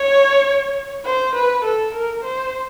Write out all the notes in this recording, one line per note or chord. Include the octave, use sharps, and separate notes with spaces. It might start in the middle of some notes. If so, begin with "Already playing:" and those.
Already playing: C#5
C5
B4
A4
A#4
C5